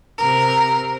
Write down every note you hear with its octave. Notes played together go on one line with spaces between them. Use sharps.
C3 A#4